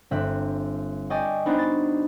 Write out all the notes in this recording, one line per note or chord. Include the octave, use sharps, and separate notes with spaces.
G1 C4 E5 F#6
D5 D#5 G5 G#5 C#6
B3 D4 D#4 F#4 C5
A6